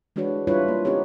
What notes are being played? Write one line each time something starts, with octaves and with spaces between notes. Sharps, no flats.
E3 G#3 D4 F#4 B4 C#5
G3 D4 E4 F4 B4 C#5
A#3
C4 C#4 D#4 G4 C#5